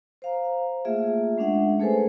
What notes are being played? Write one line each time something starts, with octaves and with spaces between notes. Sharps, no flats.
C5 F5 A#5
A3 A#3 F4 G#4 E5
G#3 C#4 D4 E5 F#5
A3 G#4 A4 B4 C5 G#5